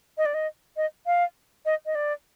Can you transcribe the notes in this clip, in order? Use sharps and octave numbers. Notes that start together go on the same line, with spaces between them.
D#5
D5
D#5
D#5
F5
D#5
D#5
D5